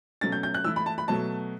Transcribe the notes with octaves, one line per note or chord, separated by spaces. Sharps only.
B2 F#3 A3 C#4 A6
G6
G6
F#6
E3 A3 E4 E6
B5
A5
B5
B2 F#3 A3 A5